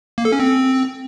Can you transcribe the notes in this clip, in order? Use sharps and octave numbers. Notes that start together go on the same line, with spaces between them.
A#3
A4
C#4
C4